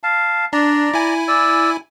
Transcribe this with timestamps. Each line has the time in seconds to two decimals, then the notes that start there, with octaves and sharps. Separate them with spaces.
0.03 F5 A5
0.53 D4 D5 A#5
0.94 E4 G#5
1.28 D5 E6